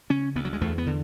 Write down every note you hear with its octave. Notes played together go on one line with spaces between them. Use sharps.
C#3 C#4
D2 B3
F#3
G#3
E2 A3
B3
D3